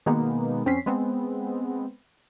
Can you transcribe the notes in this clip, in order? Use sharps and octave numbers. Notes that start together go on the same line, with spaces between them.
B2 D#3 G#3 A#3 B3 D#4
F2 C4 C#4 B6 C7
G#3 B3 C4